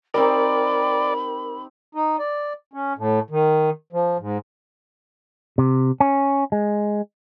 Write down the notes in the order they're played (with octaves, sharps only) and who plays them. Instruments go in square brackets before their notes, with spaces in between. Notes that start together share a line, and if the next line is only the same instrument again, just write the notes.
[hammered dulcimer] C4 D#4 G4 [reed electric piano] A#4 [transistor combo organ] D5 [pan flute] B5
[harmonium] D#4
D5
C#4
A2
D#3
F3
G#2
[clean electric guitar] C3
C#4
G#3